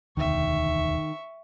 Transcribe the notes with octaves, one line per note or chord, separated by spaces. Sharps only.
E1 D2 D#3 E5 C#6